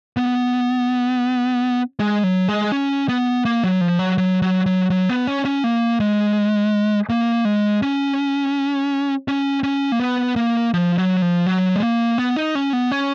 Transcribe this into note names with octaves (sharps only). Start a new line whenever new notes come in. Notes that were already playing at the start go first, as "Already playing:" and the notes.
B3
G#3
F#3
G#3
C#4
B3
A#3
F#3
F3
F#3
F#3
F#3
F#3
F#3
B3
C#4
C#4
A#3
G#3
A#3
G#3
C#4
C#4
C#4
A#3
B3
A#3
F3
F#3
F3
F#3
G#3
A#3
B3
D#4
C#4
B3
C#4